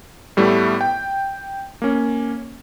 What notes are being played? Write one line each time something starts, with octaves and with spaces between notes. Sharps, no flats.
A2 G3 A3 B3 E4
G5
A#3 C#4